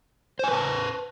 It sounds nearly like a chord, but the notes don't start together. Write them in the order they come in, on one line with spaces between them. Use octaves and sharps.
C5 G#5 B4 A5